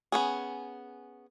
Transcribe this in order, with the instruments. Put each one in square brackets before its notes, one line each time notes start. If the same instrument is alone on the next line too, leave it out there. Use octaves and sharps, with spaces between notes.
[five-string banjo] B3 C#4 G#4